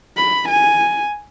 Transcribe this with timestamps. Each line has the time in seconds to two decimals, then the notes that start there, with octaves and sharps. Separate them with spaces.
0.17 B5
0.49 G#5